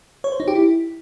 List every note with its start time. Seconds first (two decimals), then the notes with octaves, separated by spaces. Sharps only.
0.24 C#5
0.32 C5
0.40 D#4
0.48 G4
0.55 E4